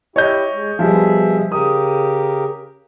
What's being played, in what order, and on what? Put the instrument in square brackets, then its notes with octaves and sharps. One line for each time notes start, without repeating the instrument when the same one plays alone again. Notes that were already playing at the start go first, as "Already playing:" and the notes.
[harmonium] E4 G4 [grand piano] C#5 D#5 G6
[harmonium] G#3
[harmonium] B2 G#4 E5 [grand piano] F3 G3
[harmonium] C#3 G4 A#4 [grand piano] D#6